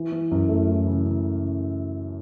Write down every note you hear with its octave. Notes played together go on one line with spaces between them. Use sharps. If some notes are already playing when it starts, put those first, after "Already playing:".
Already playing: E3
E3
F#2
A3
E3
C#3
C#3